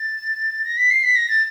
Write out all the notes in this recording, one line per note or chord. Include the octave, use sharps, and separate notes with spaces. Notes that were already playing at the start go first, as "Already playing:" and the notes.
Already playing: A6
A#6
B6
C7
B6
A#6
A6